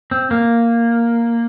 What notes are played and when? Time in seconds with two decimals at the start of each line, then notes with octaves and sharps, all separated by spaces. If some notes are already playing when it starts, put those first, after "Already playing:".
0.11 C4
0.31 A#3